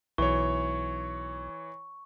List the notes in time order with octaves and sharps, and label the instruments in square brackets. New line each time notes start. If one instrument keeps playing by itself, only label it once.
[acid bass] B1 [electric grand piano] E3 C#5 [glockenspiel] C#6